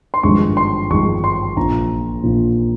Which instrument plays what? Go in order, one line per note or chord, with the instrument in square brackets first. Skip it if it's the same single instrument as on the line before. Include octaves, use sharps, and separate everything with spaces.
[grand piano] C6
G#1 G2 F3 G#3 C#6
C6
G#1 G2 F3 G#3 C#6
C6
A#1 A#2 F3 A#5
A#1 A#2 F3